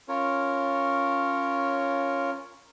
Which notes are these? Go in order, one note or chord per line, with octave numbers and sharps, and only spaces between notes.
C#4 F4 A#4 C#5